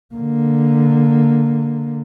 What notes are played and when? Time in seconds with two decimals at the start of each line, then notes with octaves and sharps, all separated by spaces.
0.15 D3 A#3